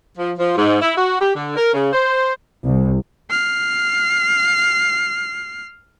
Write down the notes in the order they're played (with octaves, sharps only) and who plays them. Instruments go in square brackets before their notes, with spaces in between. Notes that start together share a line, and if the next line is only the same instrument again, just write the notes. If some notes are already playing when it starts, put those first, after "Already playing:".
[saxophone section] F3
F3
G#2
E4
F#4
G4
D3
A#4
C#3
C5
[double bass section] C2
[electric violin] F6 C7